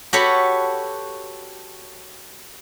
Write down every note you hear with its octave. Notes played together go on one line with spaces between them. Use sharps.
F#4 G4 A4 B4 C#5 F#5